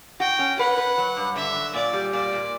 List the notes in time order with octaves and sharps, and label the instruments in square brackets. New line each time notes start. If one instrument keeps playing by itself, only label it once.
[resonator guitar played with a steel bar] F#4 [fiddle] G5
[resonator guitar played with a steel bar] C#4
[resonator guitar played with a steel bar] B4 [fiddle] F#5
[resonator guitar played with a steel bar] B4
F#3
G2
[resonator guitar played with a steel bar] D3 [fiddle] E5
[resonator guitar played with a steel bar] F#3
[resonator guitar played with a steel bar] A#2 [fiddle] D5
[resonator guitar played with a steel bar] G3
[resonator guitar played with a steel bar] A#2 [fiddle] D5
[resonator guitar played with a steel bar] A#2